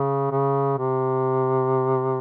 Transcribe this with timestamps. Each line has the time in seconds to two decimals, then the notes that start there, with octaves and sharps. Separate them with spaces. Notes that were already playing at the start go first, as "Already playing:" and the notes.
Already playing: C#3
0.31 C#3
0.78 C3